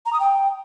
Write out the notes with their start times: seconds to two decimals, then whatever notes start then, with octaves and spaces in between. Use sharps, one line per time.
0.06 A#5
0.13 D#6
0.20 G5